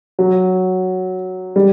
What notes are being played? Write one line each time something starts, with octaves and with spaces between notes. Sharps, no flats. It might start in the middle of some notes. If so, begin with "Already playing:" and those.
F#3
G3